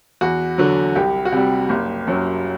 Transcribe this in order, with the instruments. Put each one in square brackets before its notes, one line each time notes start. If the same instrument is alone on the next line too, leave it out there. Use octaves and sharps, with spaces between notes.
[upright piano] E2 F#4
D3 F#3
C2 G4
F#4
C3 G3 G4
F#1
F#2 F#3